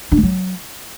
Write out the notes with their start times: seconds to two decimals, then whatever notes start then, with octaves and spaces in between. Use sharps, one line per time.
0.12 D4
0.17 A3
0.23 F#3